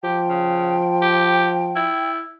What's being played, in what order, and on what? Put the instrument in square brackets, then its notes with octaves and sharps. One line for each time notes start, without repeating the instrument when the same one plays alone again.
[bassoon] F3 [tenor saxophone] G4 [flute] G5
[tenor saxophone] C#3
G4
E4